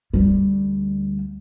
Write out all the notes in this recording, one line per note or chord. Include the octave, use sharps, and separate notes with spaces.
D2 G3